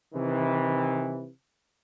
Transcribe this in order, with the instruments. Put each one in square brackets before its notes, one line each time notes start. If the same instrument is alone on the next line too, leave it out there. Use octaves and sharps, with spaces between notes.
[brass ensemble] C3 D#3 E3